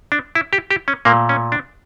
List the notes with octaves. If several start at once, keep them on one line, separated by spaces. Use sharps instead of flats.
D4
E4
G4
G4
C#4
A#2 A3 A#3
C#4
D4